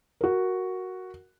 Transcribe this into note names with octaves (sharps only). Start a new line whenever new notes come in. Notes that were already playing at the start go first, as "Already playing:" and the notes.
F#4 A#4